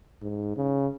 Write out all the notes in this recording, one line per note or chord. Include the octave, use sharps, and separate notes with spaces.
G#2
C#3